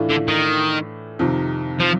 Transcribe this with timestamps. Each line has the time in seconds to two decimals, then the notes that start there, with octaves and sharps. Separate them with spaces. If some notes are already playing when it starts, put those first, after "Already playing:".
Already playing: A2 E3 A3 D4 F4
0.10 D3
0.28 D#3
1.19 F2 C3 D#3
1.80 F3